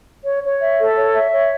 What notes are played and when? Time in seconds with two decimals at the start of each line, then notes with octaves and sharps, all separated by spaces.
0.25 C#5
0.43 C#5
0.61 E5
0.79 A4
0.96 C#5
1.14 E5
1.32 C#5